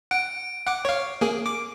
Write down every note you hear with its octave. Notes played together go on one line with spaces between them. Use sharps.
F#5 D7
F#5 D6
C#5 F5
A#3 G#4
D6